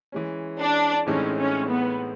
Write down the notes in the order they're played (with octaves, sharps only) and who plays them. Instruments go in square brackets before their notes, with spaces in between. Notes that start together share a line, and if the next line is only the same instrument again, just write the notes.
[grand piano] E3 G#3 C#4
[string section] D4
[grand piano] A2 E3 G#3 C4 D#4 [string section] C#4
[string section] C#4
B3